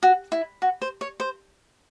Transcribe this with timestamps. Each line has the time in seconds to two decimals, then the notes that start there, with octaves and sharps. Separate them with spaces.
0.03 F#4
0.32 E4
0.62 F#4
0.82 C5
1.01 C#5
1.20 C5